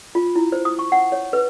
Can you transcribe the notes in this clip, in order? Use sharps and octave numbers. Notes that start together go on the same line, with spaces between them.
F4
E4
C5
D#6
C#6
F#5
C#5
B4